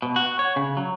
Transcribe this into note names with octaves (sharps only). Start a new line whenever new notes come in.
B2
F#4
C#5
C#3
F#3